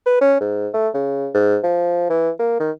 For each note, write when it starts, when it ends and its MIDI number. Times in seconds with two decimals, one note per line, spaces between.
0.06 0.21 71
0.21 0.36 61
0.40 0.68 44
0.74 0.88 57
0.94 1.29 49
1.34 1.57 44
1.63 2.09 53
2.10 2.30 52
2.39 2.58 58
2.60 2.71 51